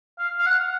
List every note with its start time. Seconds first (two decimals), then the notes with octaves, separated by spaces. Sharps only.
0.19 F5
0.39 F5
0.46 F#5